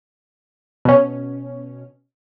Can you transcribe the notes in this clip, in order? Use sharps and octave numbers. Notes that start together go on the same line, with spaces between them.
B2 C#4